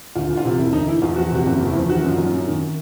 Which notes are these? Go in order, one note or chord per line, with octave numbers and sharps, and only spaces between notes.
D2 F4
E3
F4
C3
E1 E4
D2 D#4
E3 E4
E2 F4
F3 F#4
C3 F#4
F#1 F4
E2
E4
F3
D#3 F#4
F#2
F4
F#3
F#2
D#3